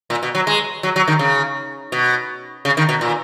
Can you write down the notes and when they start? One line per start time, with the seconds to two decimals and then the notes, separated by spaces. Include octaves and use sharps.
0.10 A#2
0.23 B2
0.35 F#3
0.47 G#3
0.83 F#3
0.96 F#3
1.08 D#3
1.19 C#3
1.92 B2
2.65 C#3
2.77 D#3
2.89 B2
3.01 A#2